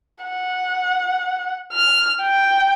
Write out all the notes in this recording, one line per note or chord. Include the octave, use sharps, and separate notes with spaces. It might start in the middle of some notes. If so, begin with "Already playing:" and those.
F#5
F6
G5